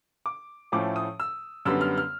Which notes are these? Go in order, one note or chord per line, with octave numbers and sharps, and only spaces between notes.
D6
A2 F3 A3 C#4 D6
D#6
E6
F#2 D3 G3 B3 E6
F6
F6